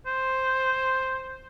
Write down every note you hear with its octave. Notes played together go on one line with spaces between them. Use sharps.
C5